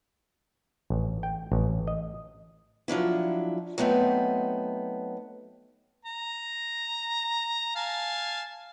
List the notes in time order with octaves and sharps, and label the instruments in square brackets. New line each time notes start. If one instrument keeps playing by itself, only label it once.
[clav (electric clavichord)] A1
G5
A1
D#5
[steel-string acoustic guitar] F3 F#3 D4 E4
F#3 A3 B3 C4 D#4
[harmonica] A#5
F5 G#5 A5